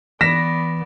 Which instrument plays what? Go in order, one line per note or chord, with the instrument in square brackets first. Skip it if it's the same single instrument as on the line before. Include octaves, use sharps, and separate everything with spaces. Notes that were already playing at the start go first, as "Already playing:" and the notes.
[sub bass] E3 [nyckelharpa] B3 D5 [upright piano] A#6 [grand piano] B6 E7